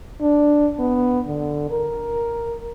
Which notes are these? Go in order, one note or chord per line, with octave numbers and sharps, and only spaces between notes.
D4
B3
D3
A#4